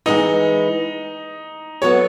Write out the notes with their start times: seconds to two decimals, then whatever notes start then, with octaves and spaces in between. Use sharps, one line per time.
0.06 E3 G#3 B3 D#4 E4
1.82 F#3 B3 F#4 A4 C#5